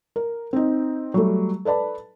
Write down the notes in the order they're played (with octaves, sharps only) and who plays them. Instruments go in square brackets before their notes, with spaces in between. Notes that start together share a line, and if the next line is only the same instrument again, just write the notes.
[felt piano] A#4
C4 D#4
F#3 G3 A3
A4 B4 D5 A5 B5